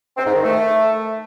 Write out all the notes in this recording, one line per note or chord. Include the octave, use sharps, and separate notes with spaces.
C4
G#2
D#3
A3